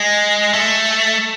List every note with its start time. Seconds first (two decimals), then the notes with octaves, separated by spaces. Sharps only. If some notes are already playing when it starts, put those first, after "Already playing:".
Already playing: G#3
0.53 A3